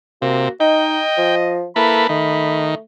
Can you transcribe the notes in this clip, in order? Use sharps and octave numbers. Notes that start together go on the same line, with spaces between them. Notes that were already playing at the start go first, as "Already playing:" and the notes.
C3 A#3 F#4
D#4 D#5 G5
F3
A#3 E4 A4 B4 B5
D#3 A3